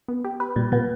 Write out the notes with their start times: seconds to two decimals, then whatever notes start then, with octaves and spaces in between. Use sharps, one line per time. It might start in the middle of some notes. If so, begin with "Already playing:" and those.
0.08 B3
0.25 G4
0.40 B4
0.56 A#2 G3
0.72 A#2 B3